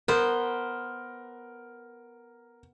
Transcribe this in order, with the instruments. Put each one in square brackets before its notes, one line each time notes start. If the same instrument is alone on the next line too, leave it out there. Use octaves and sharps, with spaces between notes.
[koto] B3 C5 [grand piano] A#4